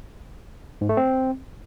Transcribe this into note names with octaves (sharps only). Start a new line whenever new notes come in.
G#2
A3
C4